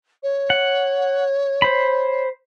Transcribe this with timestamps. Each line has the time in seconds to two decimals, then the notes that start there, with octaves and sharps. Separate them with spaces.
0.23 C#5
0.50 F#5
1.62 C5 B5